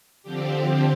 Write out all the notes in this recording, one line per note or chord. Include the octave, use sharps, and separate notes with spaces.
D3 F3 C4 G4